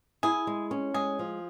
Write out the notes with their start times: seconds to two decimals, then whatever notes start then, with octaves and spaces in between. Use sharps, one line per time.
0.23 E4 G#4
0.47 G#3
0.71 C#4
0.94 G#3 G#4
1.19 F3